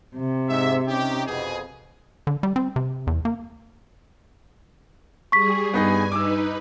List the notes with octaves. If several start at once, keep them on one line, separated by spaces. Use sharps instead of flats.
C3
G#2 E5
C#4 D#4 G4
F2 B2 G#4
D3
G3
C4
C3
E2
A#3
G3 G#4 C#6 B6
G2 B3 D#4 G#4 G#5
D#4 B4 D6 E6